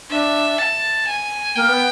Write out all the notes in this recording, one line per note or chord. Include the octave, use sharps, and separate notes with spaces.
D4 E5
A5
G#5
A#3 G5
B3